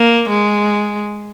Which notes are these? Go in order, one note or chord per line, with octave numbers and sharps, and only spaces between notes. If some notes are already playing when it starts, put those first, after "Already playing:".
Already playing: A#3
G#3